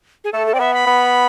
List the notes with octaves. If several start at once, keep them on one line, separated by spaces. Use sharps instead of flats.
G#4
A3 A4
A4
C4 D5
B3 E5
B5
B3